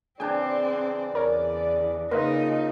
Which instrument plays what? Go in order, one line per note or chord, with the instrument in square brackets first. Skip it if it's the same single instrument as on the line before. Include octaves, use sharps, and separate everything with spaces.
[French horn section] C#3 E3 D5 [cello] C4 [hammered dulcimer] D4 G#4 [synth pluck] G5 G#5
[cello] E2 [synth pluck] A#4 C#5
[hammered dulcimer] A#2 [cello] C#3 D#4 [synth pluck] A#4 B4 D#5